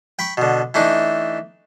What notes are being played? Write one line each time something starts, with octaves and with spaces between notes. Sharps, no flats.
G5 B5 C#6
B2 D3
E3 A3 D4 D#4